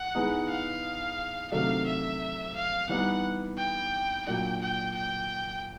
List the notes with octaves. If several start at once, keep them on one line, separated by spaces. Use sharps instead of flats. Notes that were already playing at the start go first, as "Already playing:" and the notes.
Already playing: F#5
E3 G#3 B3 D#4
F5
C3 D#3 F#3 A3 D4 F5
E5
F5
E3 G3 B3 D#4 F#5
G5
A#2 F#3 A#3 D4 G5
G5
G5